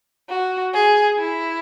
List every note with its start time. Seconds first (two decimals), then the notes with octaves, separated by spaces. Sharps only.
0.29 F#4
0.74 G#4
1.18 E4